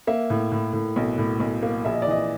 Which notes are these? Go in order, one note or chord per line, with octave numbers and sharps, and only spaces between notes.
A#3 E5
A2
A2
A2
B1
A2
B1
A#3
A#1 E5
D#5
D5
E3 D#5